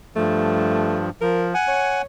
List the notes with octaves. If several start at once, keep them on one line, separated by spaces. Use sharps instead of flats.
G2 F3 A3
F3 A#4
F#5 G#5
C#5